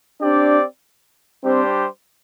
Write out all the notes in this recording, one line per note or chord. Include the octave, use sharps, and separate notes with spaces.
C4 D4 G4 D5
G3 C4 D4 G4 C5